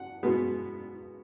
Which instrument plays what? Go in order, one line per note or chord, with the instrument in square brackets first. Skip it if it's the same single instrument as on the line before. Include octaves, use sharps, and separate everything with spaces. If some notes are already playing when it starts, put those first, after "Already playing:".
Already playing: [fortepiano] F#5
B2 G#3 B3